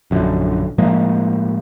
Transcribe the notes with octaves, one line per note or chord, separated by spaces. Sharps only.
A#1 F#2 D3
A2 F3 G#3 A#3